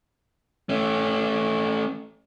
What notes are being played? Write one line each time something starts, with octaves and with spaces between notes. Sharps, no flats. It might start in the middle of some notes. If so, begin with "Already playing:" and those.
A3 C#4